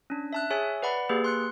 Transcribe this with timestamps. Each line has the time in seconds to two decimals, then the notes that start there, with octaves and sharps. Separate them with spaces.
0.10 C#4 D4
0.33 E5 A5 F#6
0.50 G#4 C#5 E5 G#5
0.82 B4 D5 F#5 B5
1.09 A#3 G4 G#4 B4
1.24 C6 F#6 C#7